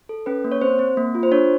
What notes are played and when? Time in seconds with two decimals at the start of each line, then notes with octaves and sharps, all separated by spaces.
0.09 A4
0.26 C#4 B4
0.44 A#3
0.52 C#5
0.61 C4 C5
0.79 C4
0.97 A#3
1.15 F4
1.23 C5
1.31 D4 C#5